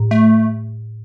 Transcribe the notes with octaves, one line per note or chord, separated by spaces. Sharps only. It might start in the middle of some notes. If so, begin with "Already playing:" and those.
Already playing: A2
A3